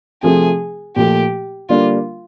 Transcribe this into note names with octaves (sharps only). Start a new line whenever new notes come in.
C3 F3 A3 C4 G#4
A#2 F3 A3 G4
D3 G3 A#3 D4 F4